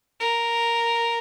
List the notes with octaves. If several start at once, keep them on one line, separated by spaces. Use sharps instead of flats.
A#4